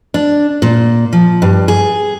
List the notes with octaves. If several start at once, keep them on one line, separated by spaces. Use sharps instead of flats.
D4
A#2
F3
G2
G#4